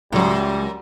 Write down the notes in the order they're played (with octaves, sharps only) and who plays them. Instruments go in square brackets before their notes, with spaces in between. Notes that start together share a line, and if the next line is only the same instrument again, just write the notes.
[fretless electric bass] C#2 [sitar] F#2 [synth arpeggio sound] A2 F#3 [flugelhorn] G3